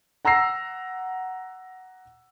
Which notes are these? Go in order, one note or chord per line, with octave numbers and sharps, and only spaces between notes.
F#5 A#5 E6 A#6 C7